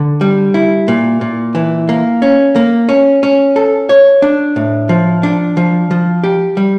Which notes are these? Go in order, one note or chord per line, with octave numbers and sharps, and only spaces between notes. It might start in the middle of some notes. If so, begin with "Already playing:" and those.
Already playing: D3
G3
E4
A#2
A#2
E3
A#3
C#4
A#3
C#4
C#4
A4
C#5
D4
A2
F3
D4
F3
F3
G4
G3